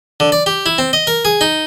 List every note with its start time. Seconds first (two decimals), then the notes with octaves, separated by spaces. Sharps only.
0.20 D3
0.32 D5
0.46 G4
0.66 E4
0.78 C4
0.93 D#5
1.07 A#4
1.25 G#4
1.41 D#4